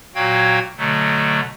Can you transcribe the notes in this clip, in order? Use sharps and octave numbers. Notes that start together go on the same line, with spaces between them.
A#2 F#3 F#4 F5 G5 G#6
B2 D3 F#3 A3